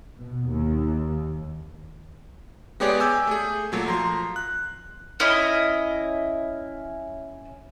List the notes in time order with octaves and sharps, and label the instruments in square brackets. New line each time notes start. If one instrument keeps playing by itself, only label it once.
[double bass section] B2
D#2
[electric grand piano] G#3 B3 G4 G#4 C#5 D5
G#5 D6 E6 G6
A3 G#4
A#2 F#3 A3
F3 A#5 C6
F#6
[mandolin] C#4 E4 D#5